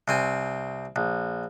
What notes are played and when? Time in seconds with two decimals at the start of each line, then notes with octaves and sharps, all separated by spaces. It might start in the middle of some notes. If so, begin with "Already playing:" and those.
0.08 C2 C4 G#5
0.96 A#1